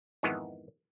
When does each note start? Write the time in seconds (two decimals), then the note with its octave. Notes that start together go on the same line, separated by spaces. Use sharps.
0.23 F2 G#2 D#3 E3 G#3 B3